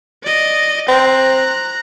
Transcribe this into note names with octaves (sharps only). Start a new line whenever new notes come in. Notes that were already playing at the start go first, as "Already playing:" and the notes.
D5 D#5
C4 A#5 F#6